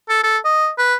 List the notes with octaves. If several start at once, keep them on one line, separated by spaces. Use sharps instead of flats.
A4
A4
D#5
B4